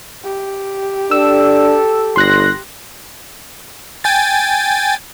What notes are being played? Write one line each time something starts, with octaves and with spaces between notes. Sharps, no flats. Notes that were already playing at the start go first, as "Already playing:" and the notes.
G4
D4 A4 E6
G1 C6 F#6 A#6
G5 G#5 A6